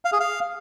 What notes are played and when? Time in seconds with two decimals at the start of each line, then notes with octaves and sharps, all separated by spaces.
0.05 F5
0.12 G#4
0.20 F5